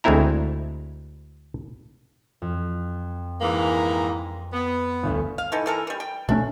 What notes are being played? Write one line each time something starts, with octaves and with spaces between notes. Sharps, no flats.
D2 G#3 A3 C4 E4 A#5
F2
G#2 E3 A#3
B3
G1 D2
F5
E3 D#4 A4
E3 A4 A#4
E3 G3
G5
B2 A3 C#4 D4